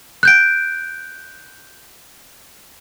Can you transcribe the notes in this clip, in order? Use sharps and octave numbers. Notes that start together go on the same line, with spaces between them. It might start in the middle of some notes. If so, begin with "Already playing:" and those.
F#6 G6 D7